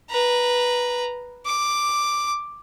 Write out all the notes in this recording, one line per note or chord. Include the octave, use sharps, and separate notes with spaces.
B4 A#5
D6